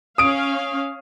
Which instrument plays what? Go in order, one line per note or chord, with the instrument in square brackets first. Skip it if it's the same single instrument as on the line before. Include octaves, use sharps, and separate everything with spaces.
[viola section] C#4 F5 [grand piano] D#6 D7